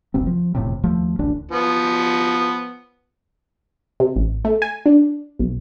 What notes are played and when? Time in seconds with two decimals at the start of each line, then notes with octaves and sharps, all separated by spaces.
0.14 F#1 D2 C3 C4
0.27 F3
0.55 E1 F2 A2 C3
0.83 D#2 F3 A3
1.19 D1 A1 D2 D4
1.52 F3 B3
4.00 C3
4.16 A1
4.45 A3
4.62 G#5
4.86 D4
5.39 B1